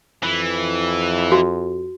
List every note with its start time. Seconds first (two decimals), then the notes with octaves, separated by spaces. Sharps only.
0.23 F2 E3
1.32 F#4